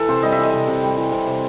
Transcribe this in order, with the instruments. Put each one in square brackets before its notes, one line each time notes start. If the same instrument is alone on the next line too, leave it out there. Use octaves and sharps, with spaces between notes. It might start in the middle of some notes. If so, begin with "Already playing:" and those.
Already playing: [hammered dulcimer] E3 A4
C3 C5
G3 D#5
E5
E3 D#5
C3
C3
G3
E3
C3
C3